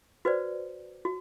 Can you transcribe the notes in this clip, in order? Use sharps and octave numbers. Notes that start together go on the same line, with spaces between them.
F#4 B4 C5 D5
F#4